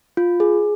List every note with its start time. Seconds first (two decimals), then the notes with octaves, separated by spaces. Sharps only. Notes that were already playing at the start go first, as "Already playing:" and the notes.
0.17 F4
0.40 G#4